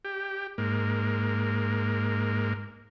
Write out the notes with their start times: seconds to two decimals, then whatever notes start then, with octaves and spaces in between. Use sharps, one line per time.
0.05 G4
0.58 G#2 A#3